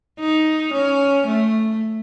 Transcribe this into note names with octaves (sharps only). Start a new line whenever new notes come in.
D#4
C#4
A3